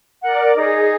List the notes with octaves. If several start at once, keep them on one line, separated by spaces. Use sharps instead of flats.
A#4 D5 F#5
D#4 G#4